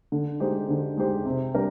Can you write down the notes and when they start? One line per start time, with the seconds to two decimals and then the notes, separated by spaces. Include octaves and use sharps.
0.12 D3
0.40 G#3 D#4 G4 C5
0.69 D3
0.97 G#3 D#4 G4 C5
1.25 C3
1.54 G3 D4 G4 A#4